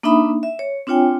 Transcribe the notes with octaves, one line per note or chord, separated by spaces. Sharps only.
A#3 D4 D#4 E5 B5 D#6
E5
C#5
C4 D4 F4 C#5 G5 G#5